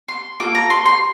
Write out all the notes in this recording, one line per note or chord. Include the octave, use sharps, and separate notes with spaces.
C6
A#3 F4 A4 D6
A#5
C6
C6